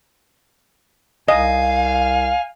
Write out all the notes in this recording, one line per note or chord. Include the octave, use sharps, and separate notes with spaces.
C2 D#5 F5 G#5